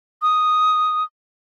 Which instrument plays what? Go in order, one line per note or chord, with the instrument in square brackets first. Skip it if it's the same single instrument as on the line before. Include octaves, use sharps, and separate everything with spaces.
[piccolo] D#6